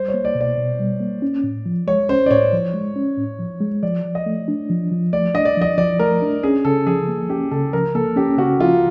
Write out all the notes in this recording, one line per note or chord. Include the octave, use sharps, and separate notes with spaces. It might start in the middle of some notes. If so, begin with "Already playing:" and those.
Already playing: G3 C5
C#5
A#3
D5
B2
D5
B2
G3
A#3
C#4
A2
F3
G#3 C#5
C#4 C5
D5
A2 C#5
F3
G#3
C#4
A2
F3
G#3
F3 D5
F3
D#5
A3
D4
F3
F3
A3 D5
D4 D#5
D5
F3 D#5
F3 D5
A3 A#4
D4
C#4 G#4
C#3 A4
F3 G#4
A#3
C#4 G4
C#3 A4
F3 A#4
A#3 A4
C#4 G4
C#3 F#4
F3 F4